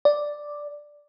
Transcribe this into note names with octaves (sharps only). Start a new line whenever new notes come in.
D5